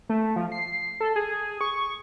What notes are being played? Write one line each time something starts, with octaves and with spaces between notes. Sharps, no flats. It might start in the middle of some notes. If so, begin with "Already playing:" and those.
A3
F3
C7
A4
G#4
C#6